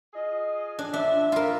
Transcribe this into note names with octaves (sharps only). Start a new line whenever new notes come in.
F4 G#4 D#5
D4
F3 D4 E5
F4 A#4